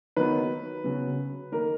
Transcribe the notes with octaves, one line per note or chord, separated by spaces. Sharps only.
D#3 F#3 B3 B4
C#3 F#3 B3
D#3 A#3 A#4